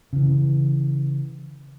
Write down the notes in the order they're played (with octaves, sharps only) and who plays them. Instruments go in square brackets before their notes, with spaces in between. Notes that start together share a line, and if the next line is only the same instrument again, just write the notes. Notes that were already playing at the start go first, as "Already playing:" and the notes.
[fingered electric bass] C#3 E3